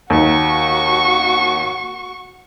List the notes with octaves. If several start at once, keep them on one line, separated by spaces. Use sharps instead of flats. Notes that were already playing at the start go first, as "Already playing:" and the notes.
D#2 D#4 F#4 C#6